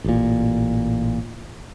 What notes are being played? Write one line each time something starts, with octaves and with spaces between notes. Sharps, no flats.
A1 A#2